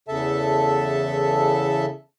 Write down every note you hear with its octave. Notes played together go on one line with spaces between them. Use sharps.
E2 C#3 A4 E5 A5